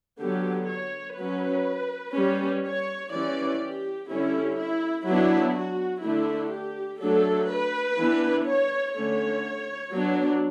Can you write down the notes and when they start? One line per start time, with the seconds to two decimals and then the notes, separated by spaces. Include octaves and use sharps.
0.20 D3 F#3 B3 G4
0.69 C#5
1.17 F#3 C#4 B4
2.15 G3 C#4
2.64 C#5
3.12 E3 G3 C#4 D5
3.61 G4
4.10 D3 G3 C#4 E4
4.58 E4
5.07 F#3 B3 D4 E4
5.56 F#4
6.04 D3 A3 D4 E4
6.53 G4
7.01 F#3 A3 D4 A4
7.50 B4
7.99 E3 B3 D4
8.47 C#5
8.95 D3 A3 C#4 C#5
9.93 F#3 B3 D4